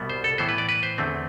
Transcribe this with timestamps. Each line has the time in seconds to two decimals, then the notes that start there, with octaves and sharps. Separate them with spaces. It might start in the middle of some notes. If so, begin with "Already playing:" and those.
Already playing: C2 B2 G3 B3
0.10 C5
0.24 A4
0.38 A2 E3 B3 C5
0.49 B4
0.58 D5
0.69 B4
0.83 C5
0.98 E2 D3 A3 C4